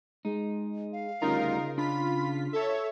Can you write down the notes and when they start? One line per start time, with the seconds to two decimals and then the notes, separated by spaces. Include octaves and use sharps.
0.25 G#3 D#4
0.93 F5
1.22 D2 C#3 G3 D#4 F4 A#4 A#5
1.78 D4 F4 B5 B6
2.53 A4 C#5 E5